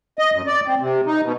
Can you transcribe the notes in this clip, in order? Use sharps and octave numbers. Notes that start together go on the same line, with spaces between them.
D#5
F#2
D5
C4
C3
D#4
B2